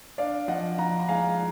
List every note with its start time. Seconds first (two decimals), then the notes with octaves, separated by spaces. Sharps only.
0.18 D4 D5 F5
0.48 F3 D#5 F#5
0.78 F3 F#5 A#5
1.00 A#5
1.08 G#3 F5 G#5